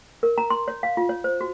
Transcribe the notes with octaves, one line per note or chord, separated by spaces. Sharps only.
A#4
A#5
C6
C#5
F5
F4
C#5
C5
F#4